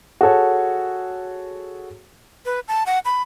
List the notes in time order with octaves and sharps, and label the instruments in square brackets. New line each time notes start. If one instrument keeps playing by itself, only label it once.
[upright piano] F#4 G#4 A4 C#5
[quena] B4
A5
F#5
B5